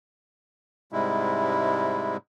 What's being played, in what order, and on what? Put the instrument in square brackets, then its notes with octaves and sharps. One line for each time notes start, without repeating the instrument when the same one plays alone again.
[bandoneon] G#2 C3 G3 G#3 E4